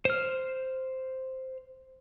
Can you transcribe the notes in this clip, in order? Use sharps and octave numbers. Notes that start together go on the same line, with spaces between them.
C5 F6